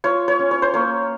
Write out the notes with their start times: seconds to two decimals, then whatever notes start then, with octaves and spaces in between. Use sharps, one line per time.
0.04 F4 C#5
0.28 C#5
0.39 C#4
0.51 C#5
0.62 C5
0.74 A#3 C#5